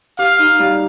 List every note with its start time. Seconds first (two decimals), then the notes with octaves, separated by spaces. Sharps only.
0.18 G4 F5
0.39 D#4
0.59 G3